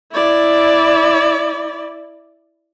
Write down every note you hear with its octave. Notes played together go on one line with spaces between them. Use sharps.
E4 D5